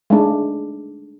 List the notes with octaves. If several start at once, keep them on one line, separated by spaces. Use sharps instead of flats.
G#3 A3 D4